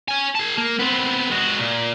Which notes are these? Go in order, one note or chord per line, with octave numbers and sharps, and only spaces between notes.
C#5 G#5
G#4 A5
A#3
B3 C4
G#3 F#4
A#2